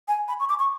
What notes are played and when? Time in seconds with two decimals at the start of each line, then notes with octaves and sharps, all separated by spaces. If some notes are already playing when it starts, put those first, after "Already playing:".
0.08 G#5
0.28 B5
0.40 C#6
0.49 D6
0.59 C#6